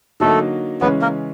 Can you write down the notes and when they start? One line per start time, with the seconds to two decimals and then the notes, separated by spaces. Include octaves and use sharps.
0.20 D3 F#3 A3 A#3 D#4 F#4 A4
0.81 C#3 E3 G#3 B3 C#4 B4
1.01 A#3 A#4